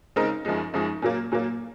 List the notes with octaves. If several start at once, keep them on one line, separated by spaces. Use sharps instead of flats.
C#3 G#3 C4 D#4 A#4
F#2 F3 G#3 D#4
F#2 F3 G#3 D#4
A#2 F#3 A#3
A#2 F#3 A#3